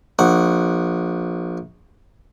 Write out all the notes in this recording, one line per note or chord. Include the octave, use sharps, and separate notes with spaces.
A#1 F#5